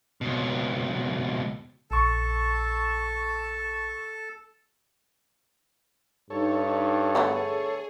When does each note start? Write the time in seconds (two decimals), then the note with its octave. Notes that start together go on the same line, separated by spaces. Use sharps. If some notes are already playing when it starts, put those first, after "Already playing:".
0.21 C#2 B2
1.91 A#1 A4 A5 C#6
6.30 G2 D#4 A4 C#5
7.15 D3 A3 B3 G#4